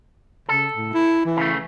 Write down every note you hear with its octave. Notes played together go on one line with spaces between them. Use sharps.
C#3 A4
A2
E4
E3
C#3 A3